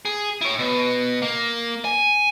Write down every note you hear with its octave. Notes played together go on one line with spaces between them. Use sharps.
G#4
E4 C#5
B2
A#3
G#5